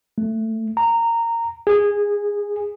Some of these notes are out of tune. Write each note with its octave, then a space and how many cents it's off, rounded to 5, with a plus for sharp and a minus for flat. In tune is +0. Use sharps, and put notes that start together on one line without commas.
A3 +15
A#5 -15
G#4 -20